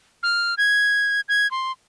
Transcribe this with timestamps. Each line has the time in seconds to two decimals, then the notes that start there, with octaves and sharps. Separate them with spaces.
0.23 F6
0.58 G#6
1.29 G#6
1.51 C6